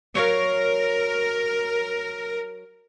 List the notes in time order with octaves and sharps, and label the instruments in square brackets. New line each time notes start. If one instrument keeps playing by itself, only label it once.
[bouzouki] F#3 C#5 F5 [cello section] A#4